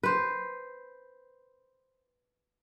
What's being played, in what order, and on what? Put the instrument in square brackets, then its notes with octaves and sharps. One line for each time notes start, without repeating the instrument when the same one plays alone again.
[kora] B4 C5